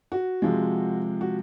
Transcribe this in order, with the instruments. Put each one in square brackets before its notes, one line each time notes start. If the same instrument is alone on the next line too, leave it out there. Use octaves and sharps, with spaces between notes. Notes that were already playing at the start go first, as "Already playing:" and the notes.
[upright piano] F#4
C3 F3 G#3
F#4